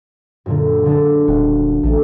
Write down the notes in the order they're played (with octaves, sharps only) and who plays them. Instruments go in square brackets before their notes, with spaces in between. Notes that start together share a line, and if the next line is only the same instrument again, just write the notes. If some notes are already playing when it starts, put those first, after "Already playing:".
[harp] F#2 A#2 D3
D3 G#3 D4
[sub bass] D#1 [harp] F#4
[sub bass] A1 [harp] A3